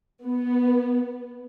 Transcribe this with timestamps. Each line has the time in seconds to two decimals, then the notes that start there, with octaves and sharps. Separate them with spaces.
0.24 B3